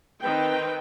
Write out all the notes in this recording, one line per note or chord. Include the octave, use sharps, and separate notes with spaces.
D#3 C4 B4 G5